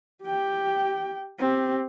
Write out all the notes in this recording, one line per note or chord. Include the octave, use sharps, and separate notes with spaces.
G4 G5
C4 G4